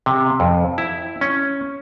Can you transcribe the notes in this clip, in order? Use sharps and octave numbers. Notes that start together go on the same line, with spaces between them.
C3
F2
E4
C#4